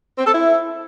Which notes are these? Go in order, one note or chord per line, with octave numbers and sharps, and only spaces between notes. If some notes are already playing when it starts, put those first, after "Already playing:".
C4
A4
E4